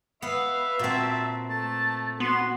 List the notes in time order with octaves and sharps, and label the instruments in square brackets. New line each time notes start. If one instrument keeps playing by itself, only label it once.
[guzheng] B3 [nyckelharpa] B4 F5 [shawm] E5
[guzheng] A#2 C4 [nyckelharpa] F#4 A5
[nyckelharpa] A3 [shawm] A5
[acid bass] B3 [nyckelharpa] F#4 [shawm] C6